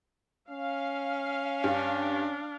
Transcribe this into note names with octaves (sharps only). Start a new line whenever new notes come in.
C#4 F5
G2 D4